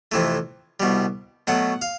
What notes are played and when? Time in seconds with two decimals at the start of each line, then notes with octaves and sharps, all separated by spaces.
0.12 F2 C3 E3 A3
0.80 C2 B2 G3
1.47 B2 F#3 A3 F#5
1.82 F5